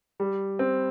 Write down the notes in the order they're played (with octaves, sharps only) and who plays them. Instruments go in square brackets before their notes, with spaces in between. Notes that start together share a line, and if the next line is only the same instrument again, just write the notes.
[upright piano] G3
C4